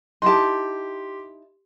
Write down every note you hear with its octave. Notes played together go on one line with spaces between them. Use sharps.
D#4 E4 G4 A5 C6